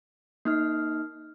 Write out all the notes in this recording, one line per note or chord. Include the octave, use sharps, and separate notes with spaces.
A#3 D#4 F6